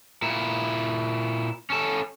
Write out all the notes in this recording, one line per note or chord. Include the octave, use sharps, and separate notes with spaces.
A#2 E4
C#4 A4